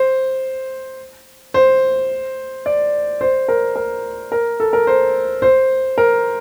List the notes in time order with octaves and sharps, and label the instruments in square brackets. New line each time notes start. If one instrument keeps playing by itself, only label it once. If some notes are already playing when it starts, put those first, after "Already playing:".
Already playing: [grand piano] C5
C5
D5
C5
A#4
A#4
A#4
A4
A#4
C5
C5
A#4